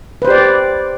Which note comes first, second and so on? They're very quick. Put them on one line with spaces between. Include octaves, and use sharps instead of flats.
B4 C5 G4 D5